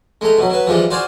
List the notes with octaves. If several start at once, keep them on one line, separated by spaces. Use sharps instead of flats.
G#3 A3 A#5
B2 F#3
F#3 B4
E3 F3 G3 G#3
F#4 C5 D5 F5 G#5